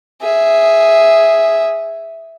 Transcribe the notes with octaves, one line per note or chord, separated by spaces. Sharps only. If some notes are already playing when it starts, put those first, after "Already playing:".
G#4 E5